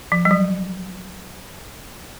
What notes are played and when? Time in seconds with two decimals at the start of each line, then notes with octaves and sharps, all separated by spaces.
0.12 F3
0.25 G3
0.31 F#3